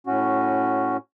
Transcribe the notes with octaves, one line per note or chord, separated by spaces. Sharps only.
A2 C#4 F#4